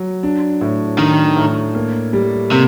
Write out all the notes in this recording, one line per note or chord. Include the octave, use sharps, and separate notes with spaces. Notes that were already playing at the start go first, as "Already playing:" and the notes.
Already playing: F#3
D4
A2
D#3 D4
A2
A#3
G3
C3 A#3